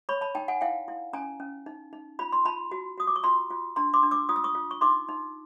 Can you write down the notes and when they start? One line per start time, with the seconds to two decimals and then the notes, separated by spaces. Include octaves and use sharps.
0.09 C#5 B5 C#6
0.21 A5 B5
0.35 D#4 G5 A5
0.48 F#5 G#5
0.61 E4 F5 G5
0.88 E4
1.13 C#4 G#5 A#5
1.40 C#4
1.66 D#4
1.93 D#4
2.19 F4 B5
2.32 C6
2.45 F4 A5 B5
2.72 F#4
2.98 F#4 D#6
3.07 D6
3.16 C#6
3.23 F4 A#5 C6
3.50 F4
3.76 D4 A#5 C6
3.94 C6 D6
4.03 D4
4.11 D6 E6
4.29 F4 D#6
4.36 E6
4.44 C#6 D#6
4.55 F4
4.71 C#6
4.81 D#4 C6 D6
5.09 D#4